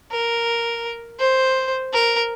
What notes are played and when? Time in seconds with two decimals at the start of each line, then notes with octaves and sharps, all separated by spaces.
0.11 A#4
1.19 C5
1.93 A#4